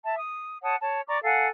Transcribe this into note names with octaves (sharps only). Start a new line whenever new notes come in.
E5 A5
D#6
C#5 F#5 A5 D#6
C#5 A5
D5 A#5 C#6 D6
A4 F5 F#5 G#5